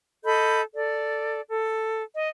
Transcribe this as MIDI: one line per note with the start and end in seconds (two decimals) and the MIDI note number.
0.24 0.62 69
0.24 0.62 75
0.24 0.62 83
0.24 0.62 91
0.74 1.39 69
0.74 1.39 74
1.49 2.02 69
2.14 2.28 75